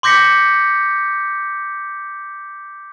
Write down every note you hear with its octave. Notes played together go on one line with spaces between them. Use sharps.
C6 D6 G6 A#6 B6 C#7